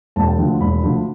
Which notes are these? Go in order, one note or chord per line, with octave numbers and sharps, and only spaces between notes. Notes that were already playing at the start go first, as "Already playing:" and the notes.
E1 A5
G5
D2 D3 F3
E1 B5
D2 D3 F3